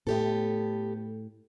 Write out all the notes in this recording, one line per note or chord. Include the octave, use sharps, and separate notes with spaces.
A2 A3 B3 G4 A4